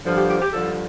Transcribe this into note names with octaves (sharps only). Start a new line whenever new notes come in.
G2 D3 F3
G4
G4
G4
G2 D3 F3 A4